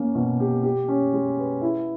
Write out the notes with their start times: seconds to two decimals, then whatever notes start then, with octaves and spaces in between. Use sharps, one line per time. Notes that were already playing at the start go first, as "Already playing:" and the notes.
Already playing: A#3 C#4
0.15 B2
0.40 G4
0.63 G4
0.88 C#4
1.13 G#3
1.38 B4
1.61 E4